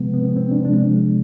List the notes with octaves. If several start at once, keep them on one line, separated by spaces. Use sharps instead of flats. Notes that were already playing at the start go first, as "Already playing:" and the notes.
Already playing: C3 F3 G#3 B3
B3
C4
C4
D4
C3 F3 G#3 D4